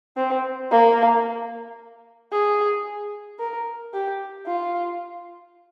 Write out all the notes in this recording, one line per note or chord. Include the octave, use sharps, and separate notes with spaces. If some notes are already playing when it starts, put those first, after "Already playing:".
C4
A#3
G#4
A#4
G4
F4